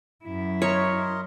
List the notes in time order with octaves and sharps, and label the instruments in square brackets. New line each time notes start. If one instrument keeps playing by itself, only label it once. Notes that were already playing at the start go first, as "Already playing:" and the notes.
[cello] F#2 E4
[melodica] A#4 D#5 C6 [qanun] C#5